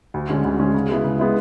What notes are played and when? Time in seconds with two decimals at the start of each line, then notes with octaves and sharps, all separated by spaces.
0.14 D2
0.29 D3 G#3 C#4
0.44 D2
0.59 D3 G#3 C#4
0.74 C#3
0.89 G#3 B3 E4
1.04 C#3
1.19 G#3 B3 E4